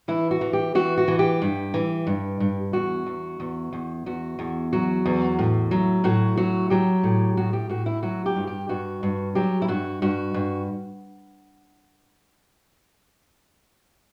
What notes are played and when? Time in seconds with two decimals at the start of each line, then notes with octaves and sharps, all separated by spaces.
0.08 E3 E4
0.31 F#4
0.41 E3
0.53 G4
0.75 E3 F#4
0.97 F#4
1.08 E3
1.19 G4
1.42 G2
1.74 E3
2.07 G2
2.40 G2
2.73 E2 F#4
3.06 E2
3.40 E2
3.73 E2
4.06 E2 F#4
4.39 E2
4.73 F#3 F#4
5.05 E2
5.39 A2
5.71 F#3
6.04 A2 F#4
6.37 F#3 F#4
6.70 F#3 G4
7.03 A2
7.37 A2 F#4
7.53 G4
7.69 A2 F#4
7.86 E4
8.03 F#3 F#4
8.26 G4
8.36 G2
8.47 G4
8.69 G2 F#4
9.03 G2
9.35 F#3 G4
9.62 E4
9.68 G2 F#4
10.02 G2 F#4
10.34 G2